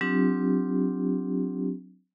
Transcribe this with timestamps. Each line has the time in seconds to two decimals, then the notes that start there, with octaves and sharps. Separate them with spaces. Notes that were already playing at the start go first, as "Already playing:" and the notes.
0.01 F#3 C4 D4 F4 G4